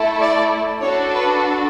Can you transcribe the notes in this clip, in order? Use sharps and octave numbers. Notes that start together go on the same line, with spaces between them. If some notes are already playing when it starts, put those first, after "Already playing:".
Already playing: A3 E4 A4
D5
D4 F#4 A4 C#5
B4